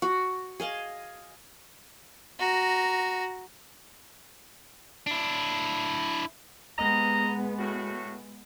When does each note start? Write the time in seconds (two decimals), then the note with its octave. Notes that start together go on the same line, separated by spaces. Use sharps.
0.02 F#4
0.60 G#4 D#5 F5
2.39 F#4 A#5
5.07 D4 E4
6.78 C3 G#3 B3 D#5 A#5
7.59 A2 F#4